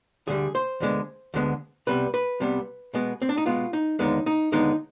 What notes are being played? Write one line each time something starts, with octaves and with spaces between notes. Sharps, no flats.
D2 D3 G3 G#4
C5
D2 D3 G#3 B3
D2 D3 G#3 B3
C2 C3 G3 B3 B4
B4
C2 C3 G3 B3
B2 G#3 B3
C4
D4
D#4
B2 G#3 B3 F4
D#4
D#2 D3 G#3 B3 D#4
D#4
D#2 D3 G#3 B3 D#4